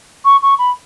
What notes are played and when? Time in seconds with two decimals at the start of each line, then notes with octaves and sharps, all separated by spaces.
0.25 C#6
0.43 C#6
0.59 B5